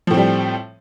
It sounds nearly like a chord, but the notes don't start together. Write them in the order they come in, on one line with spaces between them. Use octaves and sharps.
F3 A2 C4 G3